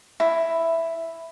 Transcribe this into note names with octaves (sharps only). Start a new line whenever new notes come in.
E4